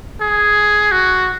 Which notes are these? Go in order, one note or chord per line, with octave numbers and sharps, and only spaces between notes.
G#4
F#4